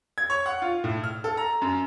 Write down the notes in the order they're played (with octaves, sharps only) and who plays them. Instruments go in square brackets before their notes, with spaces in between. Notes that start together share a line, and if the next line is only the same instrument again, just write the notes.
[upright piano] G#6
C#5
F#5
F4
A2
F6
A4
A#5
F#2